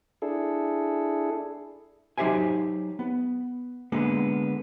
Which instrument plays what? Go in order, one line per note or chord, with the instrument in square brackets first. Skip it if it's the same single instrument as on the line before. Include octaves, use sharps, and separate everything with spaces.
[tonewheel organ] D4 E4 G#4 A4
[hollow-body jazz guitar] F#3 D#4 G4 C5 E5 G#5
B3
D3 G#3 A#3 B3